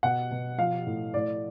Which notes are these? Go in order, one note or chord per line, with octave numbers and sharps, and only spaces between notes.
B2 F#5
B2
F3 F5
A2
A2 D5